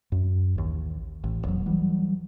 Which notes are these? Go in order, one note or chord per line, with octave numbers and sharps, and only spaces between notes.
F#2
A1 D#2
A1
D#1 E2 F#3
E3 F#3 G3